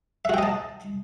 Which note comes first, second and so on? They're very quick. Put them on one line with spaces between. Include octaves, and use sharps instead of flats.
E5 F#4 G5 D#5 A5